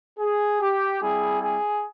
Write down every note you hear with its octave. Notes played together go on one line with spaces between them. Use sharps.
G#4
G4
G3 C4 E4 G#4
G#4